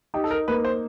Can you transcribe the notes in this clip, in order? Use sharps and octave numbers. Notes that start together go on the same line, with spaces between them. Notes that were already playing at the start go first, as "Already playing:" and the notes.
D#4 G4
A4
A#4
A#3 B4
C5